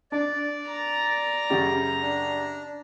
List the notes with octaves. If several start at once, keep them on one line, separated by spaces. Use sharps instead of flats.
D4 D5
A#5
F#2 C#3 G4
D4